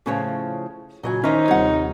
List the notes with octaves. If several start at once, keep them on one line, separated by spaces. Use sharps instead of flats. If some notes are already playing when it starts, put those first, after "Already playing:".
A2 C#3 F3 C#4 B4 C#5
A#2 C#3 F#3 D#5 G#5
D#3 C#4 D#4 E4 C5 E5 F6
D#1 C3 G3 C#5 F#5